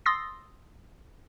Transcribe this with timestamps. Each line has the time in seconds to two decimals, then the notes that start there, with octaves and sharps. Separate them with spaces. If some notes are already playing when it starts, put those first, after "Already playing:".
0.06 C6 D#6 E6 A6 A#6 C7